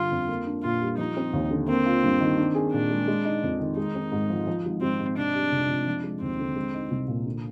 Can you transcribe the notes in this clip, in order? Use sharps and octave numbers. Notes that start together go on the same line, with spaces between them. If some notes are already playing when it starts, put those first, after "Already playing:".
Already playing: G1 D3 G3 F4
F2
A#3
D4
A#2 F4
G3
F3 D#4
C4
D#2
D3
A#3 C4
F4
G2
D#3
D4
G#4
A#2 D4
G#3
G#3
D#4
F2
D#3
G#3 D#4
C4
G#2
F3
F3
G#1
G#1 C4
G#2
C3 D4
G3
F1
F2
F3
G#3
D#2 C4
D3
G#3
D#4
C2
A#2
D3